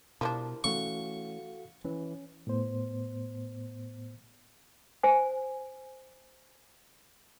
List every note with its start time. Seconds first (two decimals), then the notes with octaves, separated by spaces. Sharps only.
0.21 B2 F3 G3 D4 E4 A#4
0.64 E3 A3 C#4 F#4 A4 F5 C#6
1.85 E3 C#4
2.47 A2 B3 C5
5.03 C5 G#5